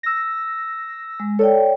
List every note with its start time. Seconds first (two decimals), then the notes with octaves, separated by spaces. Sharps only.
0.03 E6 A#6
1.20 G#3
1.39 A4 C#5 D5 G5